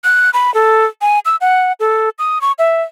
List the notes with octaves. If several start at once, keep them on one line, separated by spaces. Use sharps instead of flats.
F#6
B5
A4
G#5
E6
F#5
A4
D#6
C#6
E5